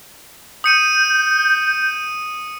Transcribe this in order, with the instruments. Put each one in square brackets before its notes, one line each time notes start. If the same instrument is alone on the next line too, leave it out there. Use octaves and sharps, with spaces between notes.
[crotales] D#6 C#7 D#7 [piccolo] G6